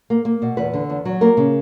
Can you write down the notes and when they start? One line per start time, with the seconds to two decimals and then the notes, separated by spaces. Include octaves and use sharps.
0.10 A#3
0.25 A#3
0.42 B2
0.57 E2 B4
0.73 D3
0.90 E2
1.05 F#3
1.21 A#3 A#4
1.37 C#3